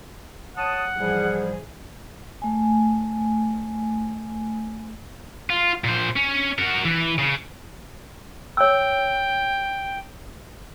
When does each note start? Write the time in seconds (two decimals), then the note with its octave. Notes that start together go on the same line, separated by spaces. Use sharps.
0.57 C#5 F#5 A5 D#6
0.98 G#2 E3 F3 G3 G#4
2.42 A3 G#5
5.50 F4
5.84 A#2 C5
6.16 C#4
6.59 F#4 A#4
6.85 E3
7.18 C#3
8.57 C#5 G5 E6